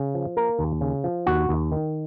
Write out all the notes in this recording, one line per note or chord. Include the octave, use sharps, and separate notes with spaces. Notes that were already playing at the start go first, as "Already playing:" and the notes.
Already playing: C#3
F3
A#3 A#4
D#2
C#3
F3
D#2 F#4
D#2
D#3